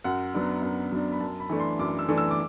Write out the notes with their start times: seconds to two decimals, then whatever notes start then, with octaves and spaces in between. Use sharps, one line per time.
0.04 F#2 F#5
0.34 F#3 B3 D4
0.62 F#2
0.92 F#3 B3 D4
1.12 B5
1.20 F#2 A5
1.40 B5
1.50 E3 A3 D4
1.60 C6
1.79 F#2 D6
1.99 E6
2.09 E3 A3 D4
2.18 E6
2.31 D6